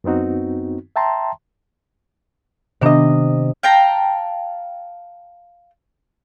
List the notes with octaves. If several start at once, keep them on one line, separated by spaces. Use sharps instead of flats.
F#2 B3 C4 D#4 F#4
E5 G5 A5 A#5 C6
C3 D#3 B3 D4 D#5
F5 G5 A5 A#5